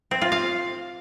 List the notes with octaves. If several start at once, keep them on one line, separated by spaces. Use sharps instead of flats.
C4
F4
F5